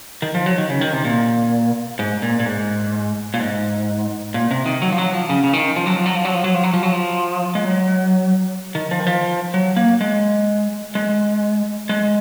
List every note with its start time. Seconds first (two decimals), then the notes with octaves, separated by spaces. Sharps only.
0.22 D#3
0.35 F3
0.46 F#3
0.58 D#3
0.70 C#3
0.81 D#3
0.93 C3
1.04 A#2
1.99 G#2
2.22 A#2
2.40 A#2
2.46 G#2
3.34 A#2
3.40 G#2
4.34 A#2
4.51 C3
4.66 D#3
4.82 F#3
4.92 F3
4.98 F#3
5.13 F3
5.29 C#3
5.44 C#3
5.53 D#3
5.76 F3
5.86 F#3
5.96 F3
6.06 F#3
6.15 F3
6.25 F#3
6.34 F3
6.44 F#3
6.54 F3
6.63 F#3
6.73 F3
6.83 F#3
6.92 F3
7.55 G#3
7.65 F#3
8.75 D#3
8.91 F3
9.00 D#3
9.06 F3
9.54 F#3
9.77 A#3
10.01 G#3
10.95 G#3
11.89 G#3